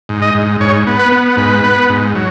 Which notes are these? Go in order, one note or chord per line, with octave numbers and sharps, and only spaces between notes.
G#2
D#5
G#2
G#2 C#5
B3
B4
B3
G#2 B4
B3
G#2
F#3